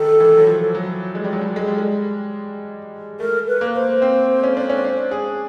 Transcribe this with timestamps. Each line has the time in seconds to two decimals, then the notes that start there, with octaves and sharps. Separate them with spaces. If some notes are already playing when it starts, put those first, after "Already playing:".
Already playing: D#3 A4
0.20 E3
0.37 F#3
0.47 F3
0.75 F#3
1.15 G#3
1.24 G3
1.33 F#3
1.41 G3
1.56 G#3
1.67 G3
1.78 G#3
3.20 A3 A#4
3.48 B4
3.61 A#3
3.75 C5
4.02 C4
4.43 C#4
4.57 D4
4.69 C#4
4.84 D4
5.11 G#4